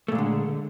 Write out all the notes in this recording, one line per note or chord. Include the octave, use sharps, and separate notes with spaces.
A#2 D3 G#3 A3